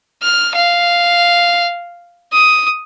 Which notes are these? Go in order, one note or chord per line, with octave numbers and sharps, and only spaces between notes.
F6
F5
D#6